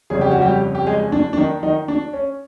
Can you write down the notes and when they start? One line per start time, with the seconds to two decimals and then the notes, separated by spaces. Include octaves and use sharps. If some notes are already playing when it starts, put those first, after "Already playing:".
0.10 G1 F2 C#3 G#4
0.21 G4
0.31 F#4
0.42 G3 G4
0.75 G4
0.87 G#3 G#4
1.12 D4
1.33 D4
1.37 D#3 D#4
1.63 D#3 D#4
1.88 D4
2.13 C#4